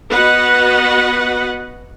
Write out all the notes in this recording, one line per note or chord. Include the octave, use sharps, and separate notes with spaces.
B3 F#4 B4 D#5 F#5